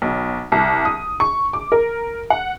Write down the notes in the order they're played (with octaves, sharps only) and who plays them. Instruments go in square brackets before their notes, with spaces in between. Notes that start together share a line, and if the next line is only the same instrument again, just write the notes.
[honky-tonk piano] B1
C2
D#6
C#6
D6
A#4
F#5